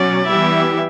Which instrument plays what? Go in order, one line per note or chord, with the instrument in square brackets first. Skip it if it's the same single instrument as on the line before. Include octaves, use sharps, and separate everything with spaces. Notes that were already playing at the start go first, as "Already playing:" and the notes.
Already playing: [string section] B2 F#3 C#4 [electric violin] D5
[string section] E3 G3 B3 E4 G4 [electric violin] E5